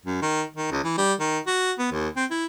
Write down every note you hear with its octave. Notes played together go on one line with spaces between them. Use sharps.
F#2
D#3
D#3
C#2
E3
G3
D#3
F#4
B3
D#2
C4
E4